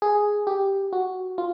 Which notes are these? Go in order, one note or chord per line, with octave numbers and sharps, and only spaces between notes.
G#4
G4
F#4
F4